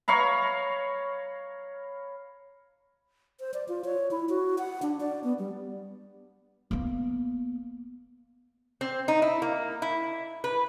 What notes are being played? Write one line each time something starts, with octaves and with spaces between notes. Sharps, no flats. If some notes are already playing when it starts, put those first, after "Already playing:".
C#5 F5 A#5 B5
C5
D5
F4
C#5
E4
F#4
F#5
D4
D5
B3
G3
A#3 B3
C4
D#4
E4
A#3
E4
B4